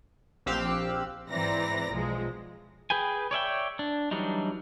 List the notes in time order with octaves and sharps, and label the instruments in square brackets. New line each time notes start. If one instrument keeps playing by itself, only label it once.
[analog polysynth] A#1 C4 G4 F5 E6 F#6
[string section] G#2 E3 C4 D5 A#5 A#6
B1 F3 G#3
[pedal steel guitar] G#4 B4 G5 G#5
C#5 D5 E5 G5
D4
E3 F#3 G3 D4 D#4